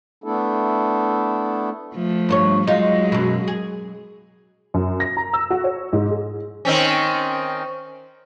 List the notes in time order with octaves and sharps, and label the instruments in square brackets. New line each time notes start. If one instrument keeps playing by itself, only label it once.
[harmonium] A3 B3 D4 E4 A4
[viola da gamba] F3 A3
[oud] G2 C5 C#5
[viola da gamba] F#3 G#3 [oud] D#4 F4
[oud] F#2 B2
G#4
[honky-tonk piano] F#2
A#6
A#5
E6
F#4
C#5
G#2
G#4
[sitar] D#3 C4 C#4